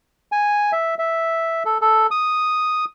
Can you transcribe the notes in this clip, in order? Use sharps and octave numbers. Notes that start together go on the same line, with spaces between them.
G#5
E5
E5
A4
A4
D#6